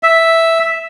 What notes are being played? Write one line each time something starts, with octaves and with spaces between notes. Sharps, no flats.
E5